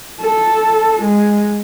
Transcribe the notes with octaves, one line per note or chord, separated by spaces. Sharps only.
A4
G#3